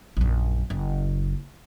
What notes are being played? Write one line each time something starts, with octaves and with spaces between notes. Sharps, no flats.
A#1 F#2
F#1